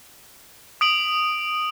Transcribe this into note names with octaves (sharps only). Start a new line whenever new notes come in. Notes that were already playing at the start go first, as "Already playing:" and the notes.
D#6 D7 F#7